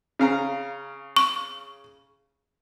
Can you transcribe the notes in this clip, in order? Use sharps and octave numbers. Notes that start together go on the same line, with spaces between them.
C#3 F5 A#5
C#6